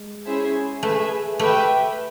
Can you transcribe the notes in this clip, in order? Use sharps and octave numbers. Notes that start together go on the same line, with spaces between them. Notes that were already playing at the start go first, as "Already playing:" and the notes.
Already playing: G#3
C#4 E4 G#4 C5 E5
A3 G#4 B4 E5
A3 G4 B4 E5 G5